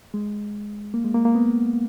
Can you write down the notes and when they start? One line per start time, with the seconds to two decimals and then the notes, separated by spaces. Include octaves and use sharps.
0.14 G#3
0.94 A#3
1.04 G#3
1.14 A#3
1.25 A#3
1.35 B3